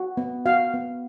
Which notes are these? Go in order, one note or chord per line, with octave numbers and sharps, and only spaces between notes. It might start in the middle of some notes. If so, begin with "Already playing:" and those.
Already playing: F#4
B3
F#4 F5
B3